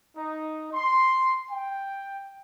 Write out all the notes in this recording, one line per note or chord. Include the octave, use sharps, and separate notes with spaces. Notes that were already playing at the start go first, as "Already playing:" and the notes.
D#4
C6
G5